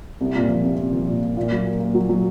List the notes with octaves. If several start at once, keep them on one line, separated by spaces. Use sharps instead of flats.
C2
A#2
F3
C2
C2
F3
A#2
A#3
A#2
F#3
A#3
A#3
F#3
F#3